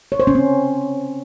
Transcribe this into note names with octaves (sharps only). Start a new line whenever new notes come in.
C#5
C5
C#4
C4